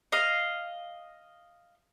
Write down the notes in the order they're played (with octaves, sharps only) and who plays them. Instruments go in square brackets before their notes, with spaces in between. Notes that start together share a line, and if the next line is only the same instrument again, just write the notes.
[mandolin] D#5 F5